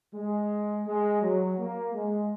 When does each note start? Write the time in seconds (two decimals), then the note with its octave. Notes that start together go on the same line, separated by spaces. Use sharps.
0.13 G#3
0.86 G#3
1.21 F#3
1.58 A#3
1.93 G#3